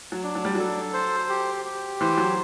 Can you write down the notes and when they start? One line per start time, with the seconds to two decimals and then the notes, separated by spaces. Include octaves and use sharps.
0.12 F#3
0.24 D4
0.35 F#3
0.45 G3
0.55 F#3 A4
0.94 C5
1.29 G4
1.65 G4
2.00 E3 C5
2.17 F#3